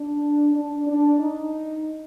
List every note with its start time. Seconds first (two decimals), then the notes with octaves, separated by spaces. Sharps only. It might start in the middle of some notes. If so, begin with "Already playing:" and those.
Already playing: D4
0.55 D4
0.87 D4
1.19 D#4